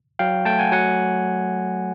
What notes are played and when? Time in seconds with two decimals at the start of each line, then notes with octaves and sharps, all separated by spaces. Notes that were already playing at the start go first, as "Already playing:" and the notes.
0.19 F#3 F5 G5
0.45 A3 G5 A5
0.59 F#5 G#5
0.72 F#3 F#5 G#5